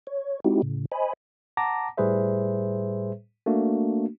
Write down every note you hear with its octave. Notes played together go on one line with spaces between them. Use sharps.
C#5
G#3 C4 D#4 E4 F#4 G4
A2 C#3
C5 D#5 G#5 B5
F#5 A5 A#5 D6 A#6
A2 G3 G#4 B4 C5 E5
A3 A#3 D4 F#4